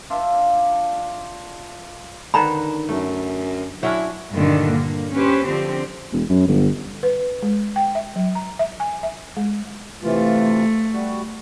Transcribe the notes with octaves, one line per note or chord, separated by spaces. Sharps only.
D4 F4 D5 E5
D3 D#3 B4 A#5 B5
F#2 A3
F#3 C#4 D4 E4
G2 A#2 D3 D#3
A#3
C#4 G4 B4 C5
D3 F3 C4 G4
E1
F#2
G1
B4
G#3
G5
E5
F#3
A#5
E5
G#5
E5
G#3
C3 E3 A3 F4
G3 F#4